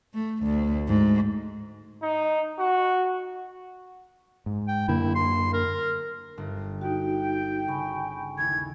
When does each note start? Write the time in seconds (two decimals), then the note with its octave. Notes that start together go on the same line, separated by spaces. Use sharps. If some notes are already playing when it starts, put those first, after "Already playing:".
0.14 A3
0.43 D2
0.88 G#2
2.02 D#4
2.59 F#4
4.46 G#2
4.68 G5
4.88 F#2 D3 A#3 E4
5.15 C6
5.53 A#4
6.38 G1
6.81 D#4 F#4 G5
7.68 C#3 G#5 B5 C#6
8.38 D#2 E4 G#6